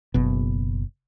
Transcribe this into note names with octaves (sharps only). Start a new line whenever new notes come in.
F#1 B2